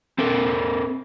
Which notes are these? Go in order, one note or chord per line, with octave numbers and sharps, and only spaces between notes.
C4 A4 A#4